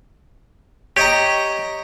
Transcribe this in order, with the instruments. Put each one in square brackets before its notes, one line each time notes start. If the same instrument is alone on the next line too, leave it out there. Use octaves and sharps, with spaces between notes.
[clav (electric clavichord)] G4 [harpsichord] C#5 D#5 A#5